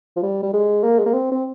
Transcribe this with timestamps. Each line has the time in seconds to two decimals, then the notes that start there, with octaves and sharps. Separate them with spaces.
0.16 F3
0.23 G3
0.43 G3
0.54 G#3
0.83 A#3
0.99 G#3
1.06 A#3
1.14 C4
1.32 C4